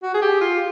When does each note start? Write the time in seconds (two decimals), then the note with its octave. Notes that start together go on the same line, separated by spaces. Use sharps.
0.02 F#4
0.14 G#4
0.22 G4
0.41 F4